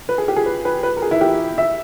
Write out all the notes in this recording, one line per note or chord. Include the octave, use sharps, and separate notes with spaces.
B4
G#4
G4
G#4
B4
B4
B4
A#4
G#4
E4
G4
E5